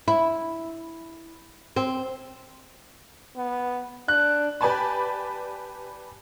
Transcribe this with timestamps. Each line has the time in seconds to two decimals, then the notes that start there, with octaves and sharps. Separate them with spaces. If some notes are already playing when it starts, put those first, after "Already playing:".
0.08 E4
1.76 C4
3.36 B3
4.08 D4 F#6
4.61 G4 B4 D5 G#5 A5 B5